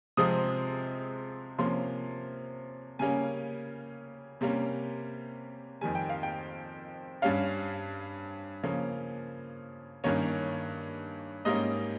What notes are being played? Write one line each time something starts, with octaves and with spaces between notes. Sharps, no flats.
C3 F3 G#3 C4 D#6
C3 F3 A#3 C#4 C6
C#3 G3 A#3 C#4 G#5
C3 G3 A#3 C#4
F2 D#3 G3 G#5
G5
F5
G5
G2 G3 C#4 F5
C#3 F3 A#3 C#4
G2 D#3 A#3 C#4 C#5
G#2 G3 A#3 C#4 D#5